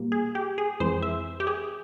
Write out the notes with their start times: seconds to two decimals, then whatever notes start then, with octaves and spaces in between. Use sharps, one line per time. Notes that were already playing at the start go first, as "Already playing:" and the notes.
Already playing: A#2 G3 A#3
0.12 G#4
0.35 G4
0.58 G#4
0.80 F2 E3 G#3 C4 C5
1.02 E5
1.40 G4
1.47 G#4